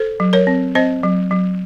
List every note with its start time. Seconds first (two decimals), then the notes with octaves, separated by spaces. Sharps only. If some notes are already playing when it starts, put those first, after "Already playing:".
Already playing: A4 C5
0.20 F#3
0.33 A#4 C#5
0.47 C4
0.75 C4 C5 D#5
1.03 F#3
1.31 F#3